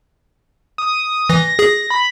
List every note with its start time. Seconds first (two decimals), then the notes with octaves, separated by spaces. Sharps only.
0.78 D#6
1.29 E3 A#6
1.59 G#4
1.90 B5